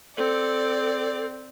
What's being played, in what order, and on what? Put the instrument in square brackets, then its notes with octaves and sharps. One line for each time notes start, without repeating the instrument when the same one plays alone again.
[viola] C4 [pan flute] A4 [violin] D5